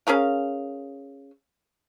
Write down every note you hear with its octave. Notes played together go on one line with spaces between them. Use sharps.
C#4 G#4 A#4 F5